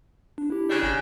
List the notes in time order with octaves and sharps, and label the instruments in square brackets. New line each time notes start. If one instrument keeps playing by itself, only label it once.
[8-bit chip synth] D4
E4 G4
[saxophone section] C#3 G3 D4
[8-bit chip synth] G#1 G#5 A#6